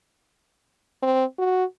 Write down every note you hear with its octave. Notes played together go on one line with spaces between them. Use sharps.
C4
F#4